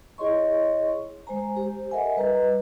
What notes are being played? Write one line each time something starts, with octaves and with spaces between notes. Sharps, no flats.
E4 G#4 C#5 D#5 C6 C#6
G#3 C5 G#5 A#5
G4 C5
A4 A#4 D#5 E5 F#5 G#5
G3 B4 D#5 A#5